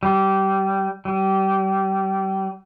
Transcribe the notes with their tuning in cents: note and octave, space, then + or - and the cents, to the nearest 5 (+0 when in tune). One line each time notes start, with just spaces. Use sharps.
G3 -20
G3 -30